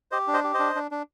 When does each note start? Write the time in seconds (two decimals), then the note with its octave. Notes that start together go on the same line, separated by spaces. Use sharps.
0.12 G4 C5 D#5
0.27 D4
0.34 C5 D#5
0.44 G4
0.54 C5 D#5
0.59 D4
0.75 D4
0.91 D4